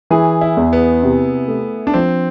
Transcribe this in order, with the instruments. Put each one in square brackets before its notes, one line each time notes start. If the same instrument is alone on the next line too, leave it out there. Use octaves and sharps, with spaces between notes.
[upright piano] E3 [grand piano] G#4
[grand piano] E4
[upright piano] E2
[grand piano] B3
[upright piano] C3
A3
[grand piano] D4
[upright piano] F3 [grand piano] C4